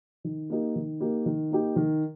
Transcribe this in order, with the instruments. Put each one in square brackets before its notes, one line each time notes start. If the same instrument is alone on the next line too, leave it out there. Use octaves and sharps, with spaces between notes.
[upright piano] D#3
A#3 D#4 G4
D#3
A#3 D#4 G4
D#3
A#3 D#4 G4
D#3